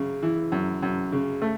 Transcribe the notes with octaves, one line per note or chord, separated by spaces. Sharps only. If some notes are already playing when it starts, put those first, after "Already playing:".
Already playing: F#2 C#3
E3
F#2
F#2
C#3
A3